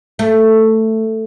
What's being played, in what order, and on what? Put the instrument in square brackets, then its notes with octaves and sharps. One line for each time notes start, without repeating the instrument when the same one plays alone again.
[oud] A3